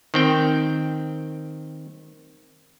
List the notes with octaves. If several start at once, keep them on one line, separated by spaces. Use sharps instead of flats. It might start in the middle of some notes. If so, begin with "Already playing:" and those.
D#3 C4 G5